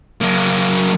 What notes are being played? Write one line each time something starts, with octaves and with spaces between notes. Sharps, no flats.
F#3 A#3